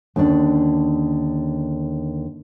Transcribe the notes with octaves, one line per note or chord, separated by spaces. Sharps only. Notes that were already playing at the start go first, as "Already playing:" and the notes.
D#2 D3 C#4 D4